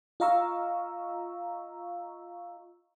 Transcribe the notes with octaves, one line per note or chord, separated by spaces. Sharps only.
F4 D#5 F5 A#5 C#6 E6